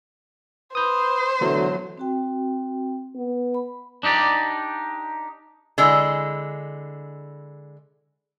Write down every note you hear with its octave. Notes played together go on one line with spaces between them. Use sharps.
B4 C5 D#6 G6
D3 E3 F#3 A3 B3
C4 F#4 G5
B3
B5
D4 D#4 G4 D5
D3 G#3 E4